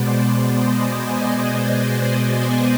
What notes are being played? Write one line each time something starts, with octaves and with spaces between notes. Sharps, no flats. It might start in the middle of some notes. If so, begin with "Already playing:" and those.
Already playing: B2 G#3 B3 C5 D5
C5
D#5
G#5
D#5
D5
G#4